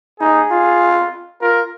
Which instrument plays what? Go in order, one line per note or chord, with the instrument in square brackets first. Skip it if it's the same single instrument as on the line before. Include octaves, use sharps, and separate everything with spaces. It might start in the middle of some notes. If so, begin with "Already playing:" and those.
[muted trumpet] D#4 [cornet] G#4
[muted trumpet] F4
[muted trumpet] F4 [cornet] A#4